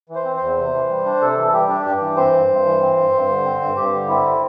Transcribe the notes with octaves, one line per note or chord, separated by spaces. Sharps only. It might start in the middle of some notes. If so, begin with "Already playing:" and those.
E3
C5
C4
E2 C5
C3
E3
G3
D4
C3 A4
E3
A4
G3 G4
D4
G2 G4
E3
C4 C5
G2
G2
E3
C4
G2
G2
D3
C4
G2
G2 G4
D3
C4 E4